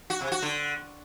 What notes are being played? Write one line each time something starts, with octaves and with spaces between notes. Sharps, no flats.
F#4
C3
F#4
D3